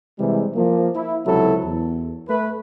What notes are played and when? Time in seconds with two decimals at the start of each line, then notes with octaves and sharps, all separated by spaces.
0.18 C3 E3 G3 G#3
0.55 F3 A#3
0.95 E4
1.25 C#2 C3 F#3 E4 A4
1.64 E2
2.28 A3 B4